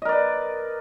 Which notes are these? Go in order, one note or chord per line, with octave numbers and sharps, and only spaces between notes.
A#4 B4 D5 D#5